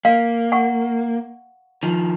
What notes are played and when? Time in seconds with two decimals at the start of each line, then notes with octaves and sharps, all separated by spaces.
0.05 A#3 F5
0.52 F#5 C#6
1.83 D#3 F3